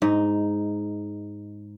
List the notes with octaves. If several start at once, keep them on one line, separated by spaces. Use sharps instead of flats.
G#2 D#4